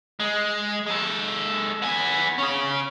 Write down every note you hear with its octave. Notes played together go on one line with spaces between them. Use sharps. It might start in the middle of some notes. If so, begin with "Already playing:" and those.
G#3
G#3 A4
B3 G#5
C#4 G#4